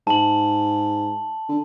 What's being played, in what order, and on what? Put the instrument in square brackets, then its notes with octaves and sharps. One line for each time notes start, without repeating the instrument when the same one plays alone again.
[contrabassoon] G#2 [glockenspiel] A5 F#7
[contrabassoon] D3